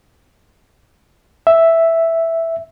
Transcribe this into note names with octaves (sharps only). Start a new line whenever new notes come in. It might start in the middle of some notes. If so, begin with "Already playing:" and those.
E5